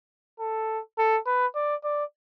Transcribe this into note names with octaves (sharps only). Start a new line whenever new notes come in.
A4
A4
B4
D5
D5